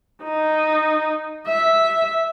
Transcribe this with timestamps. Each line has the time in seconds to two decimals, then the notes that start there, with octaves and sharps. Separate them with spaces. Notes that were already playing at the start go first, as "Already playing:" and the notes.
0.24 D#4
1.47 E5